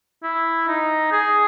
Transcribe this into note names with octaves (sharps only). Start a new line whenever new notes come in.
E4
D#4
G#4